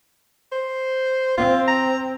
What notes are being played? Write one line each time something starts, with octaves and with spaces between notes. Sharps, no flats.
C5
C4 F4
A#5